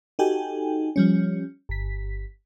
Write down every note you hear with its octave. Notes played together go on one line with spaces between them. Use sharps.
D#4 F#4 G4 A4 G5 G#5
F3 G3 C#4
G1 B6